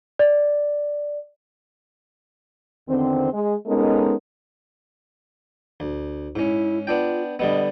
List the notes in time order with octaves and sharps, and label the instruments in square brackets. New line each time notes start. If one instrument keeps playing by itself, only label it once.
[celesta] D5
[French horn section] E2 D3 D#3 C4
G#3
G#3 B3 C#4 D#4 A4 A#4
[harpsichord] D2
[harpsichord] G#2 C#4 [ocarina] E4
[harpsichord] B3 D4 G5 [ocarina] F4
[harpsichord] D3 G3 B3 [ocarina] D#5